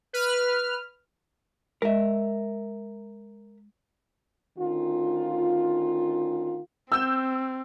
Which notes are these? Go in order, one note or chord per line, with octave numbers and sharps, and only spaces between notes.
B4 F6
G#3 A#4 D#5 E5
D2 D#3 C#4 F4
C4 E6 G6 E7